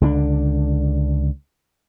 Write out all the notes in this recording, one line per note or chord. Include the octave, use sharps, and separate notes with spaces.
C#2 D3 C#4 D4